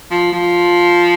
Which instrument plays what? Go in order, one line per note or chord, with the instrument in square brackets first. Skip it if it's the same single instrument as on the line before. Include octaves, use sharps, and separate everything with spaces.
[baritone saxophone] F3
F3